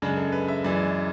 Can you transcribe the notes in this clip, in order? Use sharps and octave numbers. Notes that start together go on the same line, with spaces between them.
F#2 C#3 G#3 D4
A4
B4
E5
F#2 E3 G#3 D5